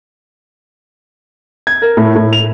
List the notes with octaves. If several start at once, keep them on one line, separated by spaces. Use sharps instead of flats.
G#6
A#4
A2
A2
F7